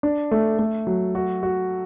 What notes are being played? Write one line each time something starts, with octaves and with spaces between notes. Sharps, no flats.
D4
A3
A3
F#3
F#4
F#4